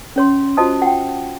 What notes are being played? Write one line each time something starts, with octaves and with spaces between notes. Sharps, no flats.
C#4 C#5 C6
F4 F#4 C5 D#5 A5 D#6
F#5 G5